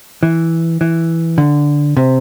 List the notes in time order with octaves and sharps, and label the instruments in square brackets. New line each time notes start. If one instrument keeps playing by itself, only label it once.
[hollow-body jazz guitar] E3
E3
D3
C3